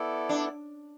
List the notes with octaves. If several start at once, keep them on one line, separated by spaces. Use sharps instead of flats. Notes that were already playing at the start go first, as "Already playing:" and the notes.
Already playing: B3 E4 A4 D5
D4